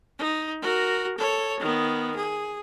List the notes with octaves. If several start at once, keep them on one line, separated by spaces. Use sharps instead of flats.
D#4
F#4 A#4
A4 C#5
D#3 B3
G#4